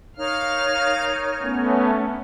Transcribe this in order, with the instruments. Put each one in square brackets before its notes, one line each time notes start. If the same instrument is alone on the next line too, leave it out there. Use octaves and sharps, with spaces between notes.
[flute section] D#4 A#4 C#5 [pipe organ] F5 F6
[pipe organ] A3 B3 C#4